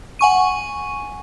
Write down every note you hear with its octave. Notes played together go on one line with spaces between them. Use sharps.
F#5 G#5 C#6 D#7